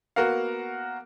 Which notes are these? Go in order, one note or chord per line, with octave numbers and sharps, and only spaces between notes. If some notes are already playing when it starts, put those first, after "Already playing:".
A#3 B3 F#4 A#4 F5